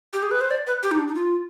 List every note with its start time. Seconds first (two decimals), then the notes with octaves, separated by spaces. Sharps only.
0.13 G4
0.23 G#4
0.31 B4
0.41 C5
0.51 D5
0.67 B4
0.83 G4
0.91 D#4
0.99 D4
1.08 D#4
1.15 F4